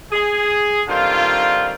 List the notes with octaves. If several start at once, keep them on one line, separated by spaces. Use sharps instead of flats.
G#4
D3 D#3 G3 C4 F4